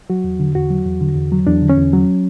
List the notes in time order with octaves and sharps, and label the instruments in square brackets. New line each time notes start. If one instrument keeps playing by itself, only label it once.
[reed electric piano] F#3 F#4
E2
D3
E2 F#4
F#3
E2
D3
E2
F#3
E2 D4
D3
C#4
E2
F#3